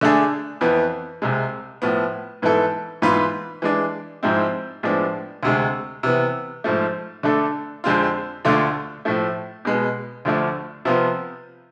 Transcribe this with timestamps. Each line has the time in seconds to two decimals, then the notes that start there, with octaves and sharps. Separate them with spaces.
0.01 D3 A3 D4 G#4
0.61 F2 E3 B3
1.22 C2 C3 G#3
1.82 A2 F3 B3
2.42 G#2 E3 B3 E4 A4
3.02 G#2 E3 B3 F4 B4
3.62 E3 G#3 D4
4.23 G#2 F3 G#3 C4 E4
4.83 A2 F3 G#3 B3 D4
5.43 D2 C3 G#3
6.03 C3 E3 B3
6.64 G#2 F3 A3
7.23 D3 A3 D4 A4
7.84 F2 D3 G#3 C4 F4
8.45 D2 D3 A3 D4 F4
9.05 A2 F3 A3
9.65 B2 G#3 B3
10.25 D2 D3 F3 A3 D4
10.85 C3 F3 B3 F4